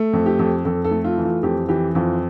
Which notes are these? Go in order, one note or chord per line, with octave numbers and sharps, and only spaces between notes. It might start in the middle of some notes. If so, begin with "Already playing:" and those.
Already playing: A3
F2
G4
F2
F2 A4
A4
A3
F4
E3
F4
F2 G4
E3 G4
F2 F4